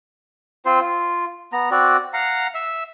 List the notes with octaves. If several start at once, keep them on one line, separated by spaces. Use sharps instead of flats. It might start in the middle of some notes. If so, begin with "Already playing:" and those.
C4 F4 C5
F4
B3 A#5
C4 F#4 D5
F5 F#5 A#5
E5